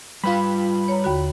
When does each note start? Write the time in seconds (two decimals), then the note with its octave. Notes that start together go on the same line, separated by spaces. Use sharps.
0.24 G3 F4 B4 B5
0.88 C#5 A#5
1.04 D#2 D3 F#4